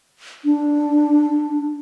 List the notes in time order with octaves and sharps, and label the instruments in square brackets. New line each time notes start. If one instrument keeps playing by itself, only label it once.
[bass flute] D4